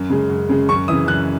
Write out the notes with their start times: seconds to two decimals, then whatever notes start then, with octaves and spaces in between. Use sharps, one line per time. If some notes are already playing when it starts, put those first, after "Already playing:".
Already playing: F#2
0.10 C#3 G#3
0.30 F#2
0.49 C#3 G#3
0.69 F#2 C#6
0.88 C#3 E3 D#6
1.07 F#2 F#6